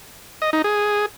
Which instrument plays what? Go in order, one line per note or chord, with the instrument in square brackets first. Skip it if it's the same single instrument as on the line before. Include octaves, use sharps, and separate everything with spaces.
[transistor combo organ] D#5
D#4
G#4